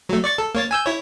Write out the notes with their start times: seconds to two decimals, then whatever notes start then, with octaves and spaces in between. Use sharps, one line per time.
0.09 F#3 A3
0.24 D5 C#6 A6
0.38 A4
0.55 A#3 C#5 A6
0.71 G#5 E6 G6
0.86 E4 C#5